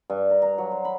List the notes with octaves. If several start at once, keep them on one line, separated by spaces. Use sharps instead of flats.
G2
A#4
A#5
F#3
C5
B5